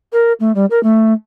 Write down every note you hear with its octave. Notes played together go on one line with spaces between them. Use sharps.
A#4
A3
G3
A#4
A3